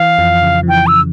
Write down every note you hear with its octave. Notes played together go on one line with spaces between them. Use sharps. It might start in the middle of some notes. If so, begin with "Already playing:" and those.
Already playing: E3 F5
F2 F3
C#3
F3
E3 G5
C#3 E6